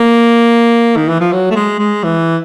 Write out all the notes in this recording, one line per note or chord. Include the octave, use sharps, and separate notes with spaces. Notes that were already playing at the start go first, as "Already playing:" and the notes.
Already playing: A#3
D#3
E3
F3
F#3
A3
G#3
G#3
E3